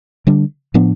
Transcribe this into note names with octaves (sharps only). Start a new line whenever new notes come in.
D3 G3 D4
A2 F3 B3 D4